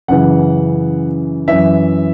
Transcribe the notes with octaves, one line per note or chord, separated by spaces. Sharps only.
F#2 C#3 E3 F#5
F#2 E3 E5